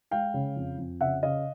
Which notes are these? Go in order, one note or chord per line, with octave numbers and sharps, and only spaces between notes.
G#3 F5 G5
C#3
F2
F2
C#3 E5 F#5
C#3 D#5 F5